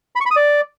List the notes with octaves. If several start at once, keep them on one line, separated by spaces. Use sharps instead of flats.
B5
C#6
B5
D#6
D5